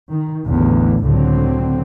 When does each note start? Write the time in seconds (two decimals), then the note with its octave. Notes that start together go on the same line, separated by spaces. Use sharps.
0.11 D#3
0.45 A1 E2 D3
1.03 C#2 A2 D3 F#3 C4